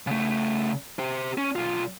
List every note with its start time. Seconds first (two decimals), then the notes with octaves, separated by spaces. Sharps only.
0.07 C#3 A3
0.99 G4 C5
1.38 C#4
1.56 B1 F4